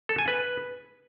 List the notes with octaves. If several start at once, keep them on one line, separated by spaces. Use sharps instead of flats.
A4
G#5
B4